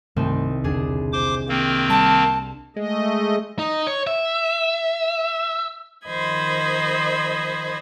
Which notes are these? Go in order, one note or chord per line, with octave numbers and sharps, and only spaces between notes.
C2 G2 D#3 A3 C4
E1 D3 D4 G#4
C5 D6
D#3 A#3 C4
G3 A5
G#3 A3 D#5
D#4
C#5
E5
D#3 F3 C5 D#5 B5 G#6